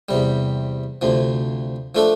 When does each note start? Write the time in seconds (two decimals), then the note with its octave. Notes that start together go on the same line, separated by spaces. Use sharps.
0.09 E2 C3 G3
1.02 D2 C3 F3
1.95 F3 A3 D4 A4